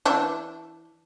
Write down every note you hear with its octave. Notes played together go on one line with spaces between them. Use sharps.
E3 D4